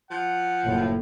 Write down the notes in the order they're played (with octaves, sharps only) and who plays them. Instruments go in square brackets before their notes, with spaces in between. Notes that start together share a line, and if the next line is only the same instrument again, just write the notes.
[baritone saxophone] F3 [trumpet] F#5
[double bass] F#1 [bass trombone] A2